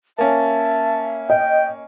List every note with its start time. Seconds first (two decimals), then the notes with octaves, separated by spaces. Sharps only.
0.18 A#3 C#4 E5 A5
1.30 D#5 G5